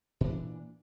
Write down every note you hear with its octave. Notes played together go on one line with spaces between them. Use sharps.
A#2 E3 D4